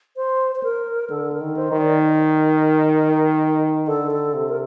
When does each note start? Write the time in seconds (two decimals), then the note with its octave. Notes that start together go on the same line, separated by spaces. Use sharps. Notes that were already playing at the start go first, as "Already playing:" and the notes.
0.16 C5
0.55 C5
0.63 A#4
1.10 D3 A4
1.32 A#4
1.41 D#3
1.57 C5
1.72 D#3
1.79 D5
2.03 A#4
3.88 D3 A4
4.11 A4
4.34 C3
4.49 A#4